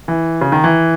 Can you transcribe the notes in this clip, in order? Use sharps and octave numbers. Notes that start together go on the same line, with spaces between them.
E3
C#3
D#3
E3